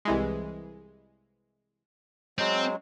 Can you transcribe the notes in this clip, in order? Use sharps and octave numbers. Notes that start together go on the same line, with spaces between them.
C2 E3 G#3
F#3 G#3 C4